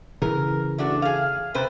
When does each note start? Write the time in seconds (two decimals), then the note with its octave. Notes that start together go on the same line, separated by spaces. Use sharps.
0.22 C#3 E3 A#4
0.78 A3 D4 F#4
1.02 G#4 F5
1.54 C3 B4 C5